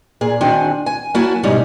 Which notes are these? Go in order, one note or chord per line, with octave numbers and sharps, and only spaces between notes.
A#2 G#4
D#3 C4 D4 F#4 G#5
G#5
F#3 A#3 E4 F#4 G#5 A5
G#2 B2 G3 C#4 D#4